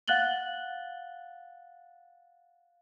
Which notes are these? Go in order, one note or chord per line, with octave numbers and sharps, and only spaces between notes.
F5 F#5 F#6 A6 F#7 G7